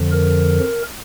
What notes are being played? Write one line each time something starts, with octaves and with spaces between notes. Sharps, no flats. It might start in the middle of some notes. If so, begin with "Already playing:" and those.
Already playing: F2 D3 F3
A#4